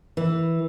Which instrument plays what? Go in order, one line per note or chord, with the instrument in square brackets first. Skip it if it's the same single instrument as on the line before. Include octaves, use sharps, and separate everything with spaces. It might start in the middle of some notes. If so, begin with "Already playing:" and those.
[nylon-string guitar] E3